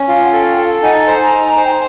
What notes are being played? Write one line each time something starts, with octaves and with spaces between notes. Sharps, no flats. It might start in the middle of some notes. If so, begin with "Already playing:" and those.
Already playing: C#4
F4
F#5
A4 F5 G5
A4
D#4 F#5 G#5
G#5 A#5
C5 G#5 A#5
G#5 A#5
D#4
C5
G5
G#5